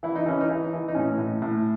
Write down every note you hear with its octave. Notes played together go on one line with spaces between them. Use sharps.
E3 E4
D#4
E3 C#4
D#4
E3
E3
D#4
A2 C#4
A2
A2